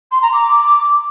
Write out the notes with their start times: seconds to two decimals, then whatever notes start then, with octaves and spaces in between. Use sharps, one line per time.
0.12 C6
0.22 A#5
0.33 D6